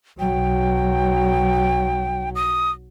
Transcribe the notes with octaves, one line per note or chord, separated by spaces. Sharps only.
B1 F#3 G5
D#6